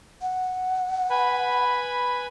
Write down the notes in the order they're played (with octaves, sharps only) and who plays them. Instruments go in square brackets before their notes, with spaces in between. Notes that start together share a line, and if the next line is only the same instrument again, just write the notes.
[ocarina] F#5
[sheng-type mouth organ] B4 G#5 B5